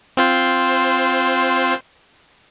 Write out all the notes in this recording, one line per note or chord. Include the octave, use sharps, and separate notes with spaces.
C4 F4 C5